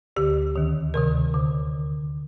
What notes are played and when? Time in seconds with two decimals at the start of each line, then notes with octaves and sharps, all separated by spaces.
0.16 D2 D3 G4
0.56 D#2 D#3
0.94 D2 C3 D#3 A#4
1.34 D3